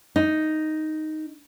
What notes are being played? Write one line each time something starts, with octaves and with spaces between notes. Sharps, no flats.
D#4